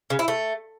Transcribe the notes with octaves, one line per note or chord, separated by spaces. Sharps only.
C#3
E4
A3